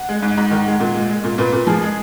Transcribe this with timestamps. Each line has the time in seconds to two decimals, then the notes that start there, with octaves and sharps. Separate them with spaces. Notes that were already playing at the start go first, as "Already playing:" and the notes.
Already playing: F#5
0.09 G#3
0.22 G#2
0.37 G#2
0.51 D#3
0.67 G#3
0.80 A#2
0.94 G#3
1.09 G#3
1.24 A#2
1.38 A#2 B4
1.52 A#2
1.67 F3 G#4
1.82 G#3